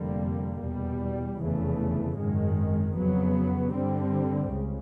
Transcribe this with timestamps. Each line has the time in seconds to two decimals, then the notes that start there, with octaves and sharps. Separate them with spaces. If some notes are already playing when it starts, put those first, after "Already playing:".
Already playing: F1 F2 D3 G3 A#3
0.61 E2 B2 G3
1.39 F1 E2 C#3 E3 A3
2.17 G#1 F#2 D#3 G#3
2.94 F2 C#3 F#3 B3
3.72 G2 D3 G3 C4
4.50 C#2 C#3